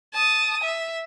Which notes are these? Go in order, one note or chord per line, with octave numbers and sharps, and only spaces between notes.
A5 D#6
E5